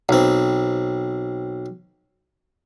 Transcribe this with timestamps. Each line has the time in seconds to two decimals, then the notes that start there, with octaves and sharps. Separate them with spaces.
0.09 B1 C4